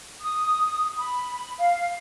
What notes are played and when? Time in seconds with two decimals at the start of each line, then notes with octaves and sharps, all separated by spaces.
0.22 D#6
0.98 B5
1.58 F5